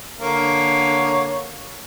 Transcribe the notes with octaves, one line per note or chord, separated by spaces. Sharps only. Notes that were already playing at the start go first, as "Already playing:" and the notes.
D3 A#3 C#5